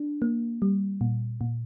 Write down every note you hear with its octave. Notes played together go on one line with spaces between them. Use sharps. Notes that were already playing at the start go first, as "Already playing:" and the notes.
Already playing: D4
A#3
G3
A#2
A#2